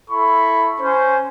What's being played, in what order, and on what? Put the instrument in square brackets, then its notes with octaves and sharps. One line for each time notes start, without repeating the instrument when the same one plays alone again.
[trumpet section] E4 A4 B5 C#6
C#4 C5